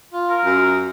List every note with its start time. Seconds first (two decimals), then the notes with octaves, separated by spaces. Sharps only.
0.13 F4
0.30 A#4
0.45 F#2